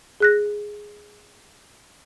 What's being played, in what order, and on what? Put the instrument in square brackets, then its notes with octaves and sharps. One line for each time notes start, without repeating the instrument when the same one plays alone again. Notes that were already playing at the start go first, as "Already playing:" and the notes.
[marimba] G#4 F#6 A#6